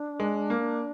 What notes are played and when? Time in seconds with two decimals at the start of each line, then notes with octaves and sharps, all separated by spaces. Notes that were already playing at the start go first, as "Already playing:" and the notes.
Already playing: D4
0.20 G#3
0.50 A#3